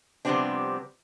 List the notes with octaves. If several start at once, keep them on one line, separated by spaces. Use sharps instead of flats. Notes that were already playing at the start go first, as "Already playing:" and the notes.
C3 F3 G3 B3 C4 D4